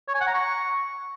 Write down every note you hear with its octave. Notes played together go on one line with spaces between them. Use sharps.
C#5
G#5
F#5
A#5
C#6